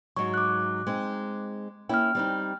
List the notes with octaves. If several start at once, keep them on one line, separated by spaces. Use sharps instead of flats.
G#2 F#3 C#6
D6 F#6
G#3 C4 D#4
A#3 C#4 E4 G5 F6
G3 C4 D#4